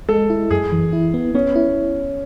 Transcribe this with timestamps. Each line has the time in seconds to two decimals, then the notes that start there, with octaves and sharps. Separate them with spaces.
0.09 G#3 A4
0.30 E4
0.51 F#2 G#4
0.72 E3
0.93 E4
1.14 B3
1.35 B3 C#4
1.56 E4